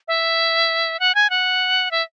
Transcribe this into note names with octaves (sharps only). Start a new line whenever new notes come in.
E5
F#5
G#5
F#5
E5